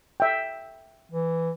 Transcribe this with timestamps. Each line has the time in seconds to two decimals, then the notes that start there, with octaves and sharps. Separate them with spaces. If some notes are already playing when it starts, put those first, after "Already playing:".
0.20 E5 G5
1.12 E3